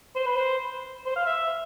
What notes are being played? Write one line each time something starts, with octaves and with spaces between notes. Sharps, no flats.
C5
B4
C5
C5
F5
E5